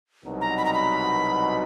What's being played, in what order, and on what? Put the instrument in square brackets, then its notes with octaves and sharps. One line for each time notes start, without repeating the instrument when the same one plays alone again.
[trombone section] C2 B2 F#3 B3 D#4
[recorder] A#5
B5
A#5
B5